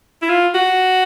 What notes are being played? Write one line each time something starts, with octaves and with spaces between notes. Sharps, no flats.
E4
F4
F#4